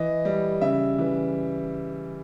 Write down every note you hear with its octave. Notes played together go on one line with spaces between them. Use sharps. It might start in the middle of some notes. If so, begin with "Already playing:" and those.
Already playing: E3 D#5
G3
C#3 E5
E3